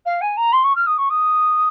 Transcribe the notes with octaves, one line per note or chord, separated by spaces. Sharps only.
F5
G#5
A#5
C6
C#6
F6
D#6
C#6
D#6